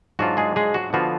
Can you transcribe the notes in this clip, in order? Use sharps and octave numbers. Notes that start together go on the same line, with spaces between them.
G#2 F#3 D4 F4 F#4
G#3 G#4
G#3 G#4
F#4
D3 F3 B3 F4 F#4